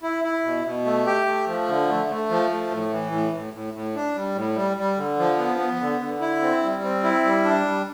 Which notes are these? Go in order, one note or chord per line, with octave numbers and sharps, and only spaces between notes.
E4
E4
B2
B2
A3
G4
A3
F3
D3
A3
A3
F3
A3
A2
E3
A2
A2
A2
A2
D4
G3
A2
G3
G3
D3
F3
B3
B3
D3
D3
E4
C4
G3
C4
E4
G3
D4
G3